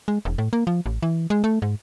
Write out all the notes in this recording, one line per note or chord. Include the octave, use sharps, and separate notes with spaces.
G#3
E1
A2
A#3
F3
A1
E3
G#3
A3
G#2